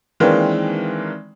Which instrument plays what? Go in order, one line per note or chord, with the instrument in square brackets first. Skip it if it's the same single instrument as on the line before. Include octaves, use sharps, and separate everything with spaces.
[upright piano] D#3 E3 G#3 A#3 C4 D4